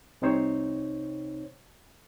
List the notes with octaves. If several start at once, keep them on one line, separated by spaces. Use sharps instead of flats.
C2 C3 C4 D#4 C5 C#5